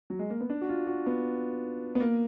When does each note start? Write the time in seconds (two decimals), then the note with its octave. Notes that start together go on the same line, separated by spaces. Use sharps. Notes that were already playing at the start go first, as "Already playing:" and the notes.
0.10 F#3
0.19 G#3
0.30 A#3
0.41 B3
0.50 D4
0.61 F#4
0.69 F4
0.87 F#4
1.06 B3
1.95 B3
2.00 A#3